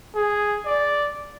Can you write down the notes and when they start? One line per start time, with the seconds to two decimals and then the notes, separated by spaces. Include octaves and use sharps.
0.16 G#4
0.66 D5